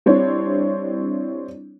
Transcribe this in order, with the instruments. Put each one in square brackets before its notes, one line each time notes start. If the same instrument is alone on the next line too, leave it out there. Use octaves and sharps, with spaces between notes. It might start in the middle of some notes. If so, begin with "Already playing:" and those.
[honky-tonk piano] G3 C4 D4 E4 C#5